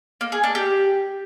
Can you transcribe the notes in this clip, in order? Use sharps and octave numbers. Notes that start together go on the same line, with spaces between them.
A#3
G#4
D4
G4